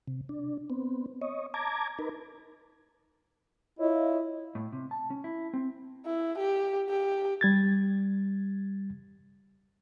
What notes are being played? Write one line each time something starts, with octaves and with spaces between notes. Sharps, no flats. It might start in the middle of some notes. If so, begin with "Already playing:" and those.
C3
D4
B3 C4
C#5 D#5
A5 A#5 D6 G#6
D#4 A#4 B4
E4 F4 C#5 D#5
A2
C3
A5
C#4
E4
C4
E4
G4
G4
G3 G#6 A6